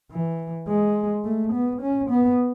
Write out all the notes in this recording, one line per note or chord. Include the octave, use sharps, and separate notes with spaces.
E3
G#3
A3
B3
C#4
B3